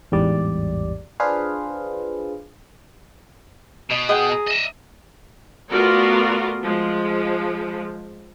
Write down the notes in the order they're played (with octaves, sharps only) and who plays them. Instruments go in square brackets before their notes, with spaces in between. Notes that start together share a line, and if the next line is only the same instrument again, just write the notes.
[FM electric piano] A1 E2 G#2 G3 D5
D4 F4 G#4 B4 C5 F5
[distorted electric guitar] B2 [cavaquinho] D#5
[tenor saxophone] G#4 [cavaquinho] D#5 F#5 G5
[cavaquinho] A#5
[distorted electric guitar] D#5 E5
[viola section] A3 B3 F4 F#4 A#4 D5
F3 G#3